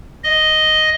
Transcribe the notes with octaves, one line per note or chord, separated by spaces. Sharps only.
D#5